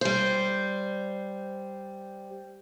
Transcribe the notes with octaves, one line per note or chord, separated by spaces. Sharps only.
G3 C5